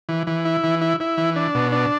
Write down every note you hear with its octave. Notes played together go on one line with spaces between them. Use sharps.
E3
E3
E4
E3
E4
E4
E3
D4
B2
D4